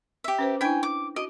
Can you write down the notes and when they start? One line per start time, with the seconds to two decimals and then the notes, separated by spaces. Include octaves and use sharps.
0.24 G4 E5
0.39 C#4 B4 C5
0.61 D4 E4 G5 G#5
0.83 D6
1.16 F#4 D#5